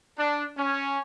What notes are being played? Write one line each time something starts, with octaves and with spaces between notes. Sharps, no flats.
D4
C#4